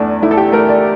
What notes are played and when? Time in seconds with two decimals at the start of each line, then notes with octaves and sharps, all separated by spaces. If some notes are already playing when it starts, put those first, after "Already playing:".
Already playing: E2 A3 D4
0.22 A3 E4
0.31 A4
0.37 G4
0.52 A3 A#4
0.69 D5